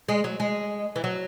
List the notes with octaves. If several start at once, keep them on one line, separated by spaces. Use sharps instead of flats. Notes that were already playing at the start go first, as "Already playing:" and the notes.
G#3
F#3
G#3
E3
F#3